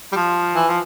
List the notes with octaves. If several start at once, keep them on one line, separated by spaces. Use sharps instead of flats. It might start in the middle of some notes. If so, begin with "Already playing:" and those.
G3
F3
E3
F3